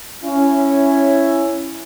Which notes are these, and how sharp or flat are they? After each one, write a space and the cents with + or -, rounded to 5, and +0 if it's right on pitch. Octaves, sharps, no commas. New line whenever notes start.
C#4 +0 E4 +10